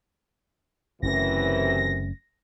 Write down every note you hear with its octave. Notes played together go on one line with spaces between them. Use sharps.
F#1 F#2 C3 E3 A3 C#4 A#6